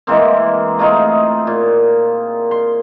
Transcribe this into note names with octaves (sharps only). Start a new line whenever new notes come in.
E3 G#3 A#3 C4
A3 D#4 F4 G#4
A#2
C6